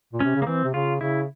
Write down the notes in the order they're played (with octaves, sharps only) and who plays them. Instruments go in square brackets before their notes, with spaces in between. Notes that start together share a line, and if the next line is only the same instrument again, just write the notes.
[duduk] A#2
[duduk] C3 [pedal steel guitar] C#4
[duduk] C#3
[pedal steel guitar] A#3
[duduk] E3 [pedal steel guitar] C4
[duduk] C3
[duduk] C#3 [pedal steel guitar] F4
[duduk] C#3 [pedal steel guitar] E4